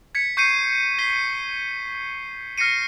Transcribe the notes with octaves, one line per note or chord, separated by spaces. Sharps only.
G#6 B6 C#7
C#6 G6 C7 C#7 D#7
B6 C7 D#7 G7
F6 A#6 C7 C#7 D#7